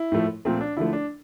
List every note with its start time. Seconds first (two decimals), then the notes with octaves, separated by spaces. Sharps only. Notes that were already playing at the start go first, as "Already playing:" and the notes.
Already playing: E4
0.12 A2 F3 A3
0.45 A#2 F3 A3 C4
0.61 D4
0.77 D3 F3 A3 E4
0.93 D4